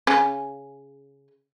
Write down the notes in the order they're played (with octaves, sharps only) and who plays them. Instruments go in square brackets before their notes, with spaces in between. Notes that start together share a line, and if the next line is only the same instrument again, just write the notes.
[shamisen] C#3 C#4